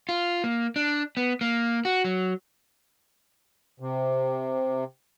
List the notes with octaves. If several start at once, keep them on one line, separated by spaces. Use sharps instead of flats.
F4
A#3
D4
B3
A#3
F#4
F#3
C3